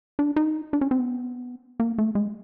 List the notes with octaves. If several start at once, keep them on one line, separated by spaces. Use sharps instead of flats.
D4
D#4
D4
C#4
C4
B3
A#3
A3
G#3